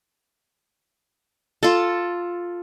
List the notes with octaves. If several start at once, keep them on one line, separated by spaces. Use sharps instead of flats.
F4 A4